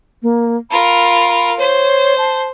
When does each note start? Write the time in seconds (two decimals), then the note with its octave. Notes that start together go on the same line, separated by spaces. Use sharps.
0.22 A#3
0.71 F4 A#4 B5
1.59 C5 C#5
2.18 A5